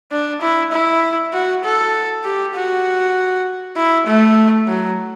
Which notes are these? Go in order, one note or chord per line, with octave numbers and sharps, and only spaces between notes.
D4
E4
E4
F#4
A4
G4
F#4
E4
A3
F#3